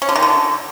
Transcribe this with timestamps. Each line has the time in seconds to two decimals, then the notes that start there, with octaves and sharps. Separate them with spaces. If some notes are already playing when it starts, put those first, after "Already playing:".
0.02 C#4
0.09 D3
0.16 D#3
0.22 D3